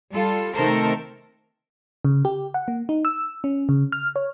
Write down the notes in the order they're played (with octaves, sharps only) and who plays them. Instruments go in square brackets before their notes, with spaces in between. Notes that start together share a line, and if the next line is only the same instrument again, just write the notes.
[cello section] G3 F4 A4
C3 D#3 A3 A4 A#4 C5
[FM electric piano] C#3
G4
F#5
A#3
D#4
E6
C#4
C#3
F6
C#5